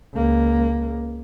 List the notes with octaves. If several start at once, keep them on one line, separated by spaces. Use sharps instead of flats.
C#2 A#3